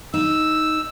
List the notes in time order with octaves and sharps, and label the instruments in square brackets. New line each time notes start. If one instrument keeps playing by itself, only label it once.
[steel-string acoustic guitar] D#4 [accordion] E6